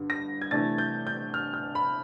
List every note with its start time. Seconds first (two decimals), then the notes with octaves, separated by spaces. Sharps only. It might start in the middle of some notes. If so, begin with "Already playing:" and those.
Already playing: G2 D3
0.10 A#6
0.42 G#6
0.51 C3 E3 A3 D4 A6
0.78 G6
1.07 G6
1.34 F6
1.54 F6
1.75 B5